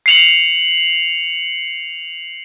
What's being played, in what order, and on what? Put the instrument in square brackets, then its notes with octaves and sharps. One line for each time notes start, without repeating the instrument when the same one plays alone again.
[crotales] C7 C#7 F7 F#7